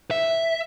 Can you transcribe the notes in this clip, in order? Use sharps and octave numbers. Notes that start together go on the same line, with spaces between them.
E5